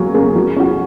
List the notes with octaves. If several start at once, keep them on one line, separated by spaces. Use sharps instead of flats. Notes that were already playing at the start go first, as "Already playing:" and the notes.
Already playing: F#3 A#3 C#4 G#4
A#3 C#4 G#4
F#3
C#4 F#4